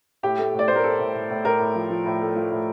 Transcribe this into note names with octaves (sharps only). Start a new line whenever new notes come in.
A2 G4
A3
A2
D5
A2 C5
A#4
A3 A4
A2
A2
A2
A2 A#4
A2
F3
F3
A2
A3
F3
A2